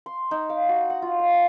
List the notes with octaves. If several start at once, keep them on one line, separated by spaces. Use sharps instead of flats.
C6
D#4
F5
F#4
F#5
F4
F5
G#5